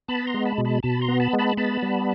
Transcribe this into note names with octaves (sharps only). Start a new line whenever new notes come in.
B3 A5 B5
A#5 C6
G#3
A5 B5
B2
A5 B5
B2 A5 B5
A#5 C6
B3
A5 B5
G#3
A5 B5
B3 A5 B5
G3